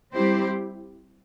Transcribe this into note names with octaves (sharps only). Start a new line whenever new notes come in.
G3 C4 E4 G4 C5